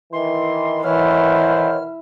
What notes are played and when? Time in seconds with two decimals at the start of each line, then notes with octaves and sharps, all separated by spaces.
0.12 D#3 E3 C6
0.84 B2 D#3 E3 C5 C#5 F6